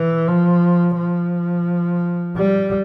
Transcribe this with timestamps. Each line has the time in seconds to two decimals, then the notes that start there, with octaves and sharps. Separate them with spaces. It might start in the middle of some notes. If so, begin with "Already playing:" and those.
Already playing: E3
0.28 F3
0.97 F3
2.37 G3